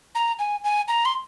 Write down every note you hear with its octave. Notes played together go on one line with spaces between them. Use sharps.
A#5
G#5
G#5
A#5
C6